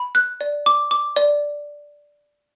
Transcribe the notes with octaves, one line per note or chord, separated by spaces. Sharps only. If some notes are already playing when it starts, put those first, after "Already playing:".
Already playing: B5
F#6
D5
D6
D6
D5